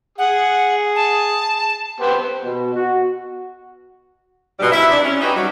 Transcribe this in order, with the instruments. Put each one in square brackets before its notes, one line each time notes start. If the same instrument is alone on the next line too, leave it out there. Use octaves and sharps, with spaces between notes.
[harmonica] G#4 [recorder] F#5
[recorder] A5
[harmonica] B3 G4 C5
[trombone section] B2
F#4
[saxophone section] G#2 B2 G3
E4 E5
C3 D4 D5
C#4
D#4 F#4 G4 B4 C#5 D#5
F#3 G3